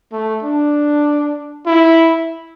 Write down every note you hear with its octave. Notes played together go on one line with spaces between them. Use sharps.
A3
D4
E4